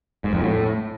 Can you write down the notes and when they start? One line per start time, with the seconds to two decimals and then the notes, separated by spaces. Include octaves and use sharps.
0.24 G#2
0.33 F2
0.41 A2